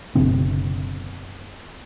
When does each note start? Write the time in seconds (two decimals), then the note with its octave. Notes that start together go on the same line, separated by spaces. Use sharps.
0.15 F#1 B2 D3 C4